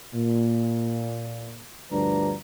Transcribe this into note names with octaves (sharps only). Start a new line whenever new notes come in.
A#2
D2 G2 F3 D4 B4 A#5